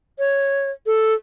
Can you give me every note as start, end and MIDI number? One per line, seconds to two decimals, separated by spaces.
0.19 0.71 73
0.86 1.14 69